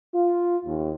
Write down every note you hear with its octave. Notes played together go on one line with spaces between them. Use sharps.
F4
D#2